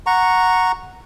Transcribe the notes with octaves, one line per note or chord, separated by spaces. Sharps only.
F#5 A#5 C#6